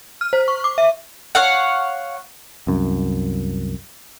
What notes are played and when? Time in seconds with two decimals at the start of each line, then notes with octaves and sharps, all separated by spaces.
0.21 F6
0.33 C5
0.48 C#6
0.64 D6
0.78 E5
1.35 C#5 F5 F#5
2.67 C2 F#2